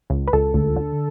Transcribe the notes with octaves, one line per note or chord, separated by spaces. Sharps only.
C#2
B4
C#2 A4
D2
D3